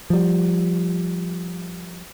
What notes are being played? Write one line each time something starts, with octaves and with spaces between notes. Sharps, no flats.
F3 G3